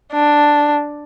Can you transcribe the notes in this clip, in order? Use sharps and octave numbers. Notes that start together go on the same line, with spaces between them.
D4